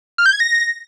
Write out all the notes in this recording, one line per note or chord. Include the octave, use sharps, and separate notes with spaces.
F6
G6
G#6
A#6